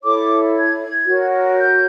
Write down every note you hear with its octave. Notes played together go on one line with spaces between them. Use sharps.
E4 A4 C#5 D6
G#6
F#4 A#4 C#5
G6